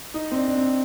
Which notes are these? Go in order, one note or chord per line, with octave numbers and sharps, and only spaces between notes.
D#4
C4
D4
D4
C4